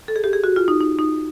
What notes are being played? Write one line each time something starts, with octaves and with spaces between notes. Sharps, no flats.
A4
G#4
G4
G#4
F#4
F4
D#4
D#4
D#4